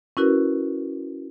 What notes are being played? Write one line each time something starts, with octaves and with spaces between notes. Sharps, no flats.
C#4 E4 F#4 A#4 B4